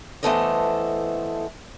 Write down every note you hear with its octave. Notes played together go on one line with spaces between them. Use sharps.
E3 A3 B3 A4 C5 D#5